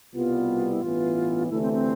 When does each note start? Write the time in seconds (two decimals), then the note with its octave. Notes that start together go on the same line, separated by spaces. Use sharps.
0.14 C2 B2 G3 B3 F4
0.73 E4
0.82 A1 G2 E3 B3 F4
1.50 D2 C3 E3 A3 E4
1.62 C4
1.73 C4